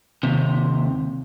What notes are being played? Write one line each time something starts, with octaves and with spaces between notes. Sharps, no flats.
D#2 C3